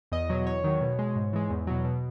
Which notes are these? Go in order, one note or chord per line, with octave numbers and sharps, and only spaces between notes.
E2 D#5
B2 F#3
E2 C#5
D#3 F#3
B2
G#3
G#2
E3 G#3
E2
B2 F#3
B2